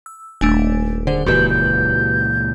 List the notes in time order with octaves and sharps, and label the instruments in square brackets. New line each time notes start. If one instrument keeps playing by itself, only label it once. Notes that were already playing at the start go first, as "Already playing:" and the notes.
[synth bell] E6
[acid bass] D#1 [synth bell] A3 D4 G#5
[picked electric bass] D3 [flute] G#4 [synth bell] C5
[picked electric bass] C#2 A#2 E3 [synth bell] F#4 G4 B4 [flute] G6
[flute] G6